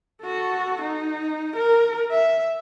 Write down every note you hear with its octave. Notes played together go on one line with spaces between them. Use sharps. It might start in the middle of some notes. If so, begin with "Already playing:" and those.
F#4 A4
D#4
A#4
E5